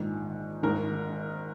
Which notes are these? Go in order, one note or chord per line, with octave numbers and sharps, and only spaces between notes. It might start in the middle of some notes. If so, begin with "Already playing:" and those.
Already playing: A#1 G#2 D#3
G#1 G#2 D#3 A#4